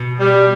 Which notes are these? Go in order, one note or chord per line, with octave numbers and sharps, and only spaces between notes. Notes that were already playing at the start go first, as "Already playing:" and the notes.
Already playing: B2
G3